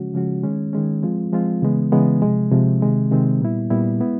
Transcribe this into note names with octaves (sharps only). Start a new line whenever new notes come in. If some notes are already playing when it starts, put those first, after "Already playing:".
Already playing: C#3 F3 G#3 C#4 F#4
C#3 F3 G#3 C#4 F#4
D#3 G#3 C#4
D#3 G#3 C#4
F3 G#3 C4 F4
F3 G#3 C4 F4
C#3 E3 G#3 B3
C#3 E3 G#3 B3
C3 F3 G#3
C3 F3 G#3
C3 D#3 G#3 C4
C3 D#3 G#3 C4
A#2 G3 B3 E4
A#2 G3 B3 E4
G#3 B3 E4